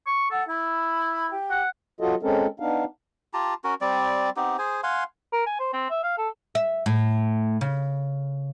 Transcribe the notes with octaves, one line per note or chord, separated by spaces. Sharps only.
C#6
A4 F#5
E4 B5
G4
F#5
F#3 F4 F#4 A4 D#5
G#3 C4 C#4 A4 A#4
B3 D4 D#4 F5
F4 G4 A5 A#5
C#4 F#4 A#4
G3 C4 D5
B3 C4 D#4 G4
G#4 C5 G#5
F5 F#5 G#5 C6
A#4
G#5
C5
C4
E5
F5
A4
E5
A2
C#3